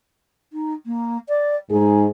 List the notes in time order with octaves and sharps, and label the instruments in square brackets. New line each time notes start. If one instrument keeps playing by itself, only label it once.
[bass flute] D#4
A#3
D5
[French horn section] G#2 G#4 [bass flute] D#4